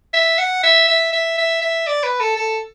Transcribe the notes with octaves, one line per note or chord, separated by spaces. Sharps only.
E5
F#5
E5
E5
E5
E5
E5
D5
B4
A4
A4